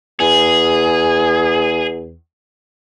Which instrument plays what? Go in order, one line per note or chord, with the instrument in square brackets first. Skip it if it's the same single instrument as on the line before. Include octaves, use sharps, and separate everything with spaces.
[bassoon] E2 [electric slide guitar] G#4